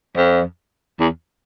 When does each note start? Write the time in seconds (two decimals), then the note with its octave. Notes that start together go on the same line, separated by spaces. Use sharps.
0.17 F2
1.00 E2